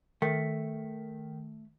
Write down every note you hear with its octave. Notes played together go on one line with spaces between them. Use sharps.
D#3 A3